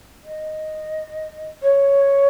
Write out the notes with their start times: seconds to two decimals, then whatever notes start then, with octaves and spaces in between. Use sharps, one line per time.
0.24 D#5
1.62 C#5